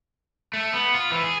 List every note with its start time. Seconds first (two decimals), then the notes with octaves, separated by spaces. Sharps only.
0.53 A3
0.73 B3
0.94 F4
1.12 E3
1.24 G#4